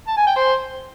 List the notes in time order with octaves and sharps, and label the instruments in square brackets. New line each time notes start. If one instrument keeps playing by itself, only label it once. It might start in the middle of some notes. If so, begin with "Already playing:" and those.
[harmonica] A5
G#5
G5
C5